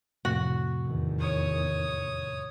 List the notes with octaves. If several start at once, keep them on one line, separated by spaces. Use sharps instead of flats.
F2 A2 C3 F#4
E2 D#3
C#5 D#6